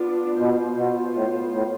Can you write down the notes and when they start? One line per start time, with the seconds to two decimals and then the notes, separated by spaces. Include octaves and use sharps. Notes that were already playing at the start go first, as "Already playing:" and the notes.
Already playing: B3 D4 F4
0.38 B2 B3 F4 C5
0.76 B2
1.14 A2
1.52 A2